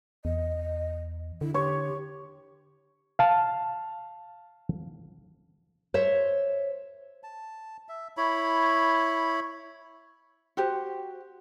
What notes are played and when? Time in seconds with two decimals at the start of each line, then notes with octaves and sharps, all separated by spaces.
0.25 E2 D#5
1.41 D3 E4
1.54 G4 C#5
3.19 F5 A5
5.94 C5 C#5 E5
7.23 A5
7.89 E5
8.17 E4 C#5 B5
10.57 F#4 G4 C5